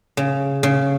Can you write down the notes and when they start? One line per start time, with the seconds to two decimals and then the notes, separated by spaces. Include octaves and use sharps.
0.17 C#3
0.63 C#3